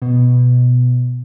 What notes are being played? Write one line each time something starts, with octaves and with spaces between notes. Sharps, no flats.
B2